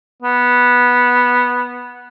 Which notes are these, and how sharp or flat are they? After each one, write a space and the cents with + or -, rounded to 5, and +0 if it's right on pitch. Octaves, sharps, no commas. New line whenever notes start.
B3 -10